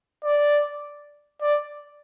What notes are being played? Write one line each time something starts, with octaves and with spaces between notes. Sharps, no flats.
D5
D5